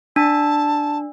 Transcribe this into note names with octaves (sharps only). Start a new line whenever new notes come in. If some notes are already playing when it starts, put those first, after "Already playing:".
D4 A5